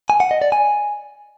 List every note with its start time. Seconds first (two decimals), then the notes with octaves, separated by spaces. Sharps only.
0.10 G#5
0.20 F#5
0.31 D#5
0.42 D5
0.52 G#5